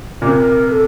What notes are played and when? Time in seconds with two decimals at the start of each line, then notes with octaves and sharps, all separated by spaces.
0.22 A#2
0.27 C3 A#4
0.70 A4